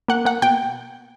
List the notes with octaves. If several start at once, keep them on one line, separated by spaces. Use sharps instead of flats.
A#3 F#5
A#3 F#5
B2 G5